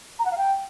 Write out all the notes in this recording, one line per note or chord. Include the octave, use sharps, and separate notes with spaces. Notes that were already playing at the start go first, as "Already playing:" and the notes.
A#5
F#5
F5
G5